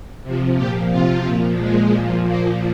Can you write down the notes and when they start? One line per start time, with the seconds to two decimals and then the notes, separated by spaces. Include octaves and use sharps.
0.23 C3 F3
0.56 A#2 F3 G4
0.90 C3 F3 F4
1.25 A#2 F3
1.59 A#2 F3 G#3
1.93 A#2 F3
2.27 A#2 F3 A#3